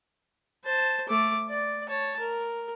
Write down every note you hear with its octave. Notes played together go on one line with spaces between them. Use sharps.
C5 A5
A3 D6
D5
C#5 A5
A#4